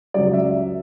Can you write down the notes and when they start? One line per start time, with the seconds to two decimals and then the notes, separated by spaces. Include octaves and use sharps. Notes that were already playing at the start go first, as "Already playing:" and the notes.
0.14 C#2 C#3 F#3 D5
0.34 E5